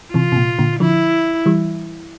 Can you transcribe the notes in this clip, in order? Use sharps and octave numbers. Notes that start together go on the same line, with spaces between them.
C3 E3 F4
C3
A#2
A#2 D3
D3 F3 E4
E3 G3